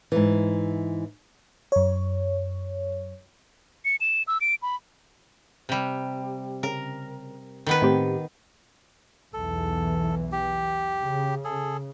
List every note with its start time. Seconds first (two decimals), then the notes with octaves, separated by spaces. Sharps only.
0.12 G#2 E3
1.72 F#2 C#5
3.85 C#7
4.01 E7
4.27 E6
4.41 D7
4.62 B5
5.69 C3 G3
6.63 C#3 A#4
7.67 D#3 B3 B4
7.82 A2 C4 G4
9.33 B1 E2 E3 A4
10.32 G4
10.99 C#3
11.44 G#4 A4